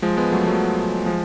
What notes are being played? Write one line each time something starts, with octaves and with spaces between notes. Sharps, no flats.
F3 G#3
G#3 B3
F#3 A3
F#3 A3
F3 G#3